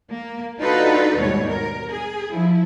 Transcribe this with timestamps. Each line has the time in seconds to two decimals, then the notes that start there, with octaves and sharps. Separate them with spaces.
0.11 A#3
0.60 D4 D#4 F4 F#4 A4 B4
1.18 D#2 G#2 B2 G3 C#5
1.51 A#4
1.91 G#4
2.33 F3 E4